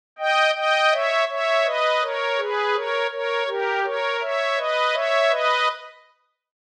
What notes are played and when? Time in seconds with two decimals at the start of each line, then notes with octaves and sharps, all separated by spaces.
0.19 D#5 G5
0.55 D#5 G5
0.92 C#5 E5
1.29 C#5 E5
1.65 B4 D#5
2.01 A#4 C#5
2.38 G#4 B4
2.75 A#4 C#5
3.11 A#4 C#5
3.47 G4 A#4
3.84 A#4 C#5
4.20 C#5 E5
4.57 B4 D#5
4.93 C#5 E5
5.30 B4 D#5